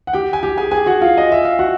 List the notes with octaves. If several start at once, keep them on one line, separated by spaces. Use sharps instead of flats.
F#5
G4 G5
G#5
G4 G5
G#4 G#5
G#4 G#5
F#4 F#5
F4 F5
D#5
E5
F5
F#4 F#5